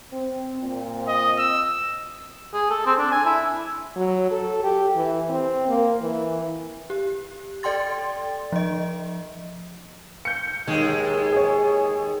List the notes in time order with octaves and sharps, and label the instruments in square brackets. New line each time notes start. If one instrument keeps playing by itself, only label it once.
[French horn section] C4
A#2 C4
[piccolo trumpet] D#5
E6
[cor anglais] G#4
A4
C4
D4
G#5
E4
[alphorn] F#3
A4
G4
E3
C4
A#3
E3
[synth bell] G4
A4 D5 G5 C6 A6
F3 D#5
[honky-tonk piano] G6 C#7
[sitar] D#2 G#3 [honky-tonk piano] D#3
[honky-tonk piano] G#4 C#5